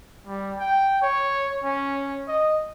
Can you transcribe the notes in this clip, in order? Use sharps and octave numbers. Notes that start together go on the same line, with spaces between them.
G3
G5
C#5
C#4
D#5